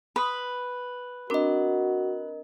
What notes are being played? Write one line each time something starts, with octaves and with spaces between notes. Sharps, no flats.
B4 B5 C6 D#6
C4 D4 F#4 A#4 D#5